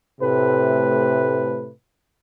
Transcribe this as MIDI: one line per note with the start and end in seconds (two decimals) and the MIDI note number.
0.20 1.71 45
0.20 1.71 48
0.20 1.71 57
0.20 1.71 71